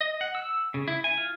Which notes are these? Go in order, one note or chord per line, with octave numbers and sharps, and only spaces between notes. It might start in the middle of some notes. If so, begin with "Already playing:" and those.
D#5
F#5
E6
C#3
E4
G#5
F4